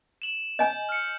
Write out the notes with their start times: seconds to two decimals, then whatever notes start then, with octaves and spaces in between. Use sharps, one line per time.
0.22 E7 F#7
0.59 D#5 G#5 G6
0.89 F6 C#7